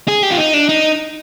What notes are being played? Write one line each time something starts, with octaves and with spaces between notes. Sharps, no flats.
G#4
G4
F4
D#4
D4
D#4